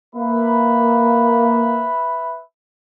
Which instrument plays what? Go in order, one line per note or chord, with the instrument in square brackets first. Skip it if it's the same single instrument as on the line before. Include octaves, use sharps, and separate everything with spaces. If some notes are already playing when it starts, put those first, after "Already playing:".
[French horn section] A#3 [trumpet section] B4 E5 B5